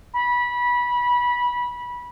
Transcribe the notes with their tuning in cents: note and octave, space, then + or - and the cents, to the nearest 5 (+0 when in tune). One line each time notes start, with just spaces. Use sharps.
B5 -20